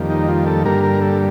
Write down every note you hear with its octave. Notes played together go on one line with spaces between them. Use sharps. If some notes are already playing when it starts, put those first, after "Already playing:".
Already playing: F2 D#3 G3 A#3
D#4
F4
A4
G2 D3 G3 A#3 A#4
A#4
A4